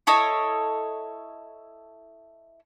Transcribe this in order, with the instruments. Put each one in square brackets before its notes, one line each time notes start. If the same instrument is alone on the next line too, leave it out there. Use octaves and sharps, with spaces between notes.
[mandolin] E4 A4 C#5 D#5